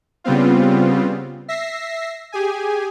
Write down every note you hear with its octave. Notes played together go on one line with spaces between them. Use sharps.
C#3 G3 B3 C4 F4
E5 A#6 C7
G4 G#4 G#5